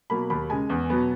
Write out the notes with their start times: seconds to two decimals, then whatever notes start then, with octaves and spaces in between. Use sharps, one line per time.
0.10 B2 F#3 A#3 B5
0.30 D#2 B5
0.50 C#3 G#3 G#5
0.70 E2
0.90 B2 F#3 B3